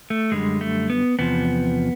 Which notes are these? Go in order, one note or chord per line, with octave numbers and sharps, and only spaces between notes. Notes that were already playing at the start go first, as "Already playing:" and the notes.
A3
F#2 D3 G3 G#3
A3
B3
E2 C3 F3 B3